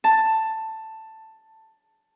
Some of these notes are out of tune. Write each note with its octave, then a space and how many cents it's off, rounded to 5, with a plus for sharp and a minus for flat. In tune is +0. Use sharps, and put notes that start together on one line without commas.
A5 +10